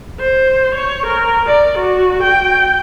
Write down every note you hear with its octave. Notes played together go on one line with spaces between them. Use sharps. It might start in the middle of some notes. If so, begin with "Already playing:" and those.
C5
C#5
A#4
D5
F#4
G5